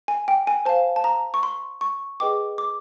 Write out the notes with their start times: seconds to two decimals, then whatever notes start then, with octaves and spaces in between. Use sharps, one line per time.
0.08 G#5
0.28 G5
0.47 G#5
0.65 C5 F5 A5
0.96 A5
1.04 A#5
1.34 C#6
1.43 C6
1.81 C#6
2.20 G#4 B4 D#5 G5 D6
2.58 D6